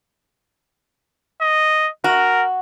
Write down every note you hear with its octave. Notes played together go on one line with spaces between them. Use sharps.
D#5
F#4 A#4